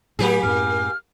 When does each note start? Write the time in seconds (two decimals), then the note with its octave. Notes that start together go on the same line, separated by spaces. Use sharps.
0.19 A2 F#3 A#3 G4 G#4
0.43 F#2 A2 F6